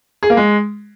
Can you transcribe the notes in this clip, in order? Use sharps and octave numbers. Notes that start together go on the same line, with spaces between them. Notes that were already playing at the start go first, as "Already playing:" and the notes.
G#4
A#3
G#3